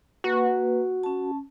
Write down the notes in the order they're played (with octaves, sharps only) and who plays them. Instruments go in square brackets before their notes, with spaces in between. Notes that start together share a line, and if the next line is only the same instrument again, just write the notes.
[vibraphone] A#3 B4 [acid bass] F#4
[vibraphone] C#4 A5